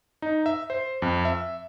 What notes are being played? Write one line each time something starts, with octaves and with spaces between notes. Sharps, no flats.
D#4
E5
C5
F2
E5